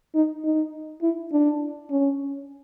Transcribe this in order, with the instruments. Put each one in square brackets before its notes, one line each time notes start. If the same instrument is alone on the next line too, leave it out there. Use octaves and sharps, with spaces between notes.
[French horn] D#4
D#4
E4
D4
C#4